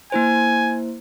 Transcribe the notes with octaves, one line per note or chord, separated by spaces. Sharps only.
A#3 E4 C5 G#5